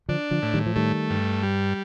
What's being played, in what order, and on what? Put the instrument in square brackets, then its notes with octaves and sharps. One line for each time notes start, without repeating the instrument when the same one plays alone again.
[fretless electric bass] D3 F3 [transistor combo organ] D4
[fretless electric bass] D3 F3
[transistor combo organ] A2
[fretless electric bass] D#3 G3
F3
[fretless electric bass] D#3 G3 [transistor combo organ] A3
[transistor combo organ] G2
G3